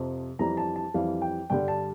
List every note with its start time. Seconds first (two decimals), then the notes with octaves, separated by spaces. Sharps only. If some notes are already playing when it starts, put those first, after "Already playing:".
Already playing: F2 C3 F3
0.39 F2 E3 G3 A#5
0.57 A5
0.76 A5
0.94 F2 E3 G3 F5
1.22 G5
1.50 G2 D3 G3 G5
1.68 A5